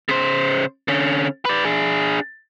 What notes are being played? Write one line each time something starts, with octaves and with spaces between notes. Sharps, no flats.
C#3 C5
D3 C#4
B4 D5
D4 G#4